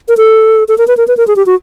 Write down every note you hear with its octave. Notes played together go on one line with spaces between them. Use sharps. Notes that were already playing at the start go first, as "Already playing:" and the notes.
A#4
A4
A4
A#4
B4
A#4
B4
A#4
G#4
G4
F#4